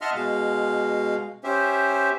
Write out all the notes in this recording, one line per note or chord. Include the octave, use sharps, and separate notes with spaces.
D#5 E5 F#5 A5 C6 F6
B2 G#3 F5
C#4 G4 C5 E5